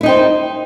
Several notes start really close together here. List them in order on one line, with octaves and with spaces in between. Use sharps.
E4 D#4 G5 C5